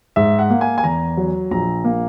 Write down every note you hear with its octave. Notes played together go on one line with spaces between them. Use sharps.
G#2 E5
F#5
A#3
G#5
G#5
E2 A#5
F#3
A#1 A#5
A#3